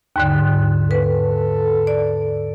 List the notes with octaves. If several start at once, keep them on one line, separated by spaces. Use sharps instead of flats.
D#2 G#2 D3
A4 B4
D5